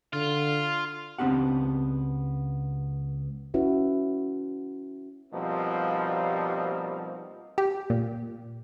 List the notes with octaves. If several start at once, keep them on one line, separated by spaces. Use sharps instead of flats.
D3 F4
C#2 B3 C4 D4 G4 F#5
C#4 E4 F#4 B4
B2 F3 G3 A#3 C4 D#4
G4
A#2